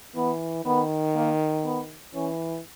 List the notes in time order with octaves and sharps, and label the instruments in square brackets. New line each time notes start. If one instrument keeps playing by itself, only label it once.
[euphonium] E3 [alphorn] B3
[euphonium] D#3 [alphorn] B3
[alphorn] A#3
B3
[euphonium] E3 [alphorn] C#4